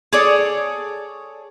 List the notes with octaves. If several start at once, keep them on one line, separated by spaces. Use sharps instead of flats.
G#4 A4 C#5 D5